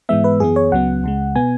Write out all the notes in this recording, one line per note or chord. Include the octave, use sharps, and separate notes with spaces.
G#2 E3 G#3 B3 E5
B4
F#2 E3 B3 G#4
C#5
C#2 C#3 F#3 B3 F#5
C#2 C#3 G#3
B2 B3 G#5